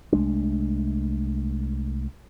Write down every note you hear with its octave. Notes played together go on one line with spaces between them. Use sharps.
C2 G#3 A3 D4